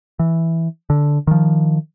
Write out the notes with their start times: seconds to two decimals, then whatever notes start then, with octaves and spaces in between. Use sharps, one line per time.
0.19 E3
0.90 D3
1.27 D#3 F3